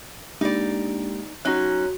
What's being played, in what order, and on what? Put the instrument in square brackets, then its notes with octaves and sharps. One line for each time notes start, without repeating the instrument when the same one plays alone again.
[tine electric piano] G#3 A#3 G4 [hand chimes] D4 [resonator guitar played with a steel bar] D#4 D5
[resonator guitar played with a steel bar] F#3 C#4 D#4 [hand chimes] F#4 F#6 [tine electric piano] C#5 A#5